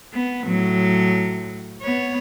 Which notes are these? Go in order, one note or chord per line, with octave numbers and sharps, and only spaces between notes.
B3
A2 F#3
B3 C#5